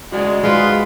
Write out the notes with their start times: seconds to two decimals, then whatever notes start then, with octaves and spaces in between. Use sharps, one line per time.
0.12 C#3 G#3 F#4 D5 F#5
0.43 G#2 G#3 F4 G#4 B4